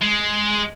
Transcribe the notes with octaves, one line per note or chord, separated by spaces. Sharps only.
G#3